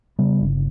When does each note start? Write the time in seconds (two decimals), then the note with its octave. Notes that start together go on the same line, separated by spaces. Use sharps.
0.19 C#3 G3 B3
0.40 G1